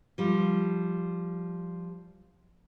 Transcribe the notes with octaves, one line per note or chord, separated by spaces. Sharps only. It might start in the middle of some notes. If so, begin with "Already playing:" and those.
F3 G3